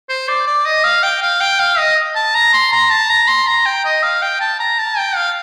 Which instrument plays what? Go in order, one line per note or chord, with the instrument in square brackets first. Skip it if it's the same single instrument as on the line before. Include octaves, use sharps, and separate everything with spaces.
[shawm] C5
D5
D5
D#5
F5
G5
F5
G5
F5
D#5
A5
A#5
C6
A#5
A5
A#5
C6
A#5
G5
D#5
F5
G5
A5
A#5
A5
G5
F5